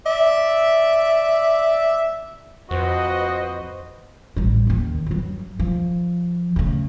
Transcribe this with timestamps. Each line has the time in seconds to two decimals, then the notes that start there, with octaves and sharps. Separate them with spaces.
0.06 D5 E5
2.71 F2 F#4 B4 C5 D#5
4.36 A1 G3
4.67 F#1 D#2
5.07 G2 F#3
5.60 F3
6.56 C#3 A3